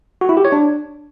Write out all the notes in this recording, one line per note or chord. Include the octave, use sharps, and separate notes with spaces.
F#4
E4
G4
C#5
D4